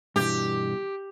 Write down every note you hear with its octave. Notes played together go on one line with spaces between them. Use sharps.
G2 B2 E3 G4